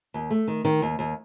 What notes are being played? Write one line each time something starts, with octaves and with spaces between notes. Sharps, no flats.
D#2
A3
D#3
D#3
D#2
D#2